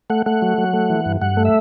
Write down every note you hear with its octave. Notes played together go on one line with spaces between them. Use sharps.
A3 F#5
A3 F#5
F#3
F#3
A3
E3
G2
G2 F#5
A3
E5